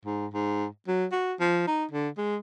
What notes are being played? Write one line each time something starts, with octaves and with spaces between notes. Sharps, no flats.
G#2
G#2
F#3
F#4
F3
D#4
D3
G#3